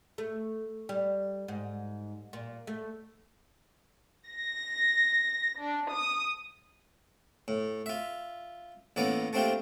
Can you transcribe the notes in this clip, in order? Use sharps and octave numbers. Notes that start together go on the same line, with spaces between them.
A3
G3
G#2
A#2
A3
A#6
D4
D#6
A2
F4 E5
A1 A2 A#3 B3 D5 A#5
A3 A#3 C4 D4 F4 G4